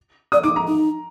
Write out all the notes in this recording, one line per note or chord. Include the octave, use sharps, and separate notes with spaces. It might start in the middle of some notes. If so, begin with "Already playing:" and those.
D5 D#6
D#4 D6
A#5
D#4